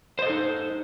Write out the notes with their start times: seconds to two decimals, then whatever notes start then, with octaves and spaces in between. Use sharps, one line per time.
0.19 C5
0.22 D#5
0.26 A4
0.30 D#4